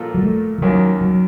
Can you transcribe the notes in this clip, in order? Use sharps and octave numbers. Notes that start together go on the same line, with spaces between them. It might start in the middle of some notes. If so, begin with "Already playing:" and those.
Already playing: A#2 F3 A#3 F4 A4
F#3
A3
F3
D#2 D#3 F#3 A#3 C#4
F#3